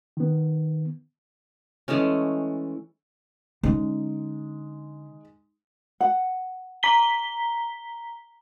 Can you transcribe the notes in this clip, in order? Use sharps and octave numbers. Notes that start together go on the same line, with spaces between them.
D#3 B3
E3 G#3 A3 C#4
D3 G#3 C#4 D#4
F#5
A#5 B6 G7